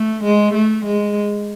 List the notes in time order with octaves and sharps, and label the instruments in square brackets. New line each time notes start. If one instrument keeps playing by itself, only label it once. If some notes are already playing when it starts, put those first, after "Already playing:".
Already playing: [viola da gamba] A3
G#3
A3
G#3